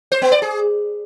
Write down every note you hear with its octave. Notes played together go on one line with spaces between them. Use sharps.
C5
B3
D5
G#4